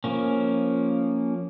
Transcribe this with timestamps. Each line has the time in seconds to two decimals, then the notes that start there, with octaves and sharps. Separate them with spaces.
0.04 F3 A#3 C#4